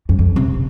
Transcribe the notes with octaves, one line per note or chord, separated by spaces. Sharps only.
F#2
F2
C3